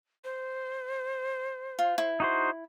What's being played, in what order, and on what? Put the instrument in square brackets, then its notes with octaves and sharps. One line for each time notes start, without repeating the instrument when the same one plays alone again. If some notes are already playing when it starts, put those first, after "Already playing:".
[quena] C5
[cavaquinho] F4
E4
[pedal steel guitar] D#4 F#4 C5